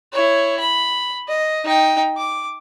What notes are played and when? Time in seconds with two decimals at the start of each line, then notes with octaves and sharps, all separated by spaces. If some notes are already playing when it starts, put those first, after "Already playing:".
0.13 E4 C#5
0.60 B5
1.28 D#5
1.64 D#4 G5
2.17 D6